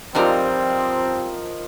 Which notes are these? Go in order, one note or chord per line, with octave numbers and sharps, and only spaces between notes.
G2 F3 G3 C4 D#4 A#4 A#5